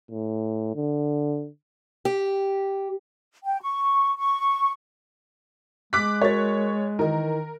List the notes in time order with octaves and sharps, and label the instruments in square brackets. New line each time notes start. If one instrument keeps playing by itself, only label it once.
[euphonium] A2
D3
[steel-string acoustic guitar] G4
[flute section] G5
C#6
C#6
[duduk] G#3 [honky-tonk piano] D6 F#6 B6
[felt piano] F#4 A#4 A6 [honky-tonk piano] C#5
[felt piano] D#3 E3 D#5 [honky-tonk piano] A#4